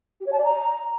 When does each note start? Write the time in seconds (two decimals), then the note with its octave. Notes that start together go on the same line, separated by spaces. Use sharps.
0.20 G4
0.26 C#5
0.32 A5
0.38 D5
0.44 A#5